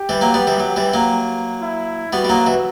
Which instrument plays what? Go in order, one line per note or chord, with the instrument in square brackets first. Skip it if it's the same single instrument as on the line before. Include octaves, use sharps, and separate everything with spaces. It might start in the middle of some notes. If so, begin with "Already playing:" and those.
Already playing: [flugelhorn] G4
[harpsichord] E3 G3
F#3 A#3
G3 B3
E3 G3
F#3
E3 G3
F#3 A#3
[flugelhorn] E4
[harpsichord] G3 B3 [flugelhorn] F#4
[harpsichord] G3
F#3 A#3
E3